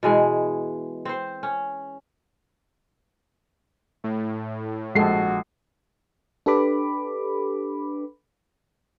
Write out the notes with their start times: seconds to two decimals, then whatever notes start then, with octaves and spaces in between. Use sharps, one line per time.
0.03 B2 E3 G#3
1.05 C4 C5
1.43 C#4
4.04 A2
4.95 A#1 G#3 F#4 A4 A5 C7
6.46 D4 G4 A4 B4 B5 D6